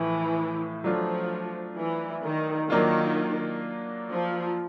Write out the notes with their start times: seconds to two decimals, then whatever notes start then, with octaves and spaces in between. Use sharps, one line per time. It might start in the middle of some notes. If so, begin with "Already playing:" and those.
Already playing: A2 E3 F3
0.84 F3 F#3 A3 D4 F4
1.77 E3
2.23 D#3
2.70 D#3 F#3 A#3 D4 F4
4.10 F3